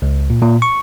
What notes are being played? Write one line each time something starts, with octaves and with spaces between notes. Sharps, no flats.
C#2
A#2
A#2
C#6